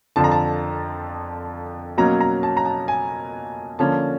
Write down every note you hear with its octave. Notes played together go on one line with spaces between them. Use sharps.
F2 D3 F3 A5
A#5
A5
B2 F#3 A#3 C#4 A#5
A#5
A5
A#5
A5
G#5
D3 F3 A#3 C#4 A5